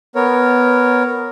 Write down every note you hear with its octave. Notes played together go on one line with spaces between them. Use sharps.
B3 A#4 C#5